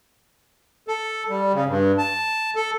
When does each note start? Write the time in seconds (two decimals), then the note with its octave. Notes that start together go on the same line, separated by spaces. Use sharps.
0.88 A4
1.29 G3
1.54 C#3
1.67 G2
1.98 A5
2.56 A4